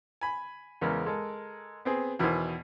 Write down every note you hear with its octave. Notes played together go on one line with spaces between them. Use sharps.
G#5 B5
E2 C#3 G#3 B3 A#4
G#3 A4 A#4
B3 C4 G#4
E2 B2 D#3 E3 C5 G#5